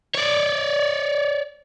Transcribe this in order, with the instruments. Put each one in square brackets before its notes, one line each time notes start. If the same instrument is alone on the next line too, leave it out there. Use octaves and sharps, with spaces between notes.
[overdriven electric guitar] C#5 D5